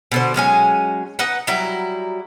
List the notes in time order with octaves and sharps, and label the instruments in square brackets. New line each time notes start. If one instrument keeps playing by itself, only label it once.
[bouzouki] B2 D3 C5
F#3 G#3 C#4 G#5
D#4 B4 F#5
F#3 G3 E4 A#5